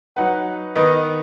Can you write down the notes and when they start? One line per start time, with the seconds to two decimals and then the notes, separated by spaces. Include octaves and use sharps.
0.17 F#3 D#4 B4 F#5
0.75 D#3 B3 D#4 B4 D#5